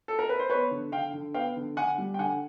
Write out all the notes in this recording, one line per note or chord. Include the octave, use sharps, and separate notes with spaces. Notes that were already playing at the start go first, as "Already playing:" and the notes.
A4
A#4
B4
C5
B3 B4 C#5
D3
D3 F5 G5
D3
B3 F5 G5
D3
D3 F#5 G#5
G3
G5
D3 F#5 G#5